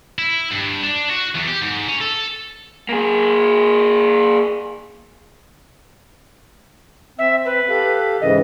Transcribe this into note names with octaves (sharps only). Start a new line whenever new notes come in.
E4
G2
D4
F#4
E2
G4
G#2
C#4
A4
A#3 G#4
C4 E5
B4
G4 A4 F5
G#2 C#3 E3 D#5